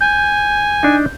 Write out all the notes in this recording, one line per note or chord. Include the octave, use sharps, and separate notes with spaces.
G#5 G6
D4 D#4